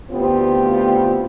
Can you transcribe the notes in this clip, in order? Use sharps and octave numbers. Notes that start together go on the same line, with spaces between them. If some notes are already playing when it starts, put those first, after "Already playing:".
D2 A2 B3 C4 F4 G4